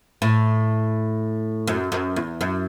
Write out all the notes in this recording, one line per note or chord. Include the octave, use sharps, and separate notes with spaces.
A2
F#2
F#2
E2
F#2